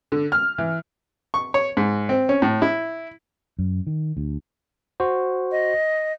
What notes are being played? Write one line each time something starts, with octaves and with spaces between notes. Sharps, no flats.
D3
F6
E3
C#6
C#5
G#2
C4
C#4
A2
E4
F#2
D#3
D2
F#4 C5
D#5